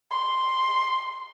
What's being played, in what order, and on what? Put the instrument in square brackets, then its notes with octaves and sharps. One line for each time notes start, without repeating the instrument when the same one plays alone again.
[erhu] C6